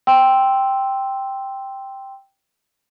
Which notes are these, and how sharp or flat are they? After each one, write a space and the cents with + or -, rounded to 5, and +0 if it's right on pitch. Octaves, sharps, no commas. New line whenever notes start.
G5 +0 C6 +0 E6 +0